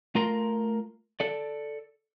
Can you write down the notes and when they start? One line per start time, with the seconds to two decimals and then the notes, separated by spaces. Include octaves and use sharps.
0.15 A3 F4 A#4 A#5 C6
1.20 A4 D5